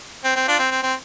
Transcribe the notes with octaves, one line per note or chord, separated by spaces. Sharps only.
C4
C4
D4 F4
C4
C4
C4